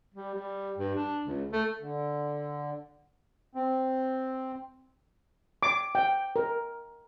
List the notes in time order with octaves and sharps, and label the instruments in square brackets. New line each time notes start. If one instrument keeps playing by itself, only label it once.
[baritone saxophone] G3
G3
G2
D4
C#2
A3
[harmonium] D3
[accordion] C4
[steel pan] D6
G5
A#4